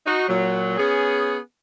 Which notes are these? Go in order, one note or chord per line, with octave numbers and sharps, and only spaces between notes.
D#4 F#4
A#2 F#3
B3 C#4 G#4